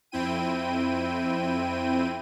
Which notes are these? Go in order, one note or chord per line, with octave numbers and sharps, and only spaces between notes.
F2 C4 E4 G5 D#7